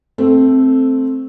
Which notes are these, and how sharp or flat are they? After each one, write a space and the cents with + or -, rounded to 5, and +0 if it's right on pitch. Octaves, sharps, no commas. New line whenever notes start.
A3 +0 C4 +0 A4 +0